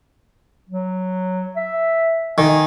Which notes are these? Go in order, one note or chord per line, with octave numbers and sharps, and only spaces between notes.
F#3
E5
D#3 G#5